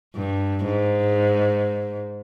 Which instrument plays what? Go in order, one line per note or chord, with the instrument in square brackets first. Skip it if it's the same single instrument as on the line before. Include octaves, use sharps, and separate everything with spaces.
[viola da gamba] G2
G#2